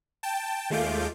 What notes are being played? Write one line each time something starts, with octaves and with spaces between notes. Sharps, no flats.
G5 A5
D#2 G#3 A3 F4 D6 G6